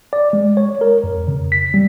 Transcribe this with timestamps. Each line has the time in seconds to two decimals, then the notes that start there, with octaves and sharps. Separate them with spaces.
0.13 D5
0.33 G#3
0.57 C#5
0.81 A#4
1.04 F2
1.28 C#3
1.52 B6
1.74 G3